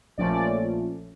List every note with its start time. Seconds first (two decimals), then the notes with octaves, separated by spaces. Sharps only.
0.18 A#1 A#2 F3 A3 C#4 D5
0.33 D5